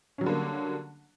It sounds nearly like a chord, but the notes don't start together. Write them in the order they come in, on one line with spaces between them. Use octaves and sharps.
C#4 F#3 G3 D3 A#3